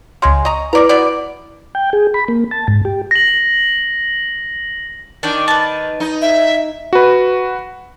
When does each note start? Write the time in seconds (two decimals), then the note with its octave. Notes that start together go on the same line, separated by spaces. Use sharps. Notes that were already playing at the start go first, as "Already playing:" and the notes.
0.22 C#2 C#3 G#3 G#5 C6
0.45 D#5 A#5 C#6
0.73 E4 A#4 B4 D5 A#5
0.89 B2 B3 D5
1.75 G5
1.93 G#4
2.14 B5
2.28 A#3
2.51 A5
2.68 G#2
2.85 G4
3.11 A#6 F#7
5.23 D#3 D4 D5 G5
5.48 B4 A5
6.00 D#4
6.22 E5
6.93 F#4 B4